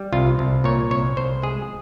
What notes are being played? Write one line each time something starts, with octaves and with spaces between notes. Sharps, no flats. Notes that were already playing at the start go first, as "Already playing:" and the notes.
Already playing: G3
C2 F4
C2
A#2 C#5
C2 C#5
C2 C5
G#3 G#4